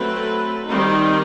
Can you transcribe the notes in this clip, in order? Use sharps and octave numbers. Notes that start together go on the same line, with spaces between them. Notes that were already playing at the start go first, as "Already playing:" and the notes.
Already playing: F#3 A3 C4 A4 B4
D#3 G3 C4 D#4